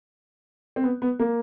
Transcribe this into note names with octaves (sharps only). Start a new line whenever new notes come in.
C4
B3
B3
A#3